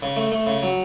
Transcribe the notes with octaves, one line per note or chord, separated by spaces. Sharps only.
C#3
A3
A3
C#3
F#3